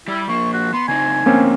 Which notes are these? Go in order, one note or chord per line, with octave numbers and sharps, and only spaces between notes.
G3 E4 G4
F3 A#3 C#6
F#4
B3 C6
C#3 C4 D#4 G#5
F2 A2 D3 A#3 C4 C#4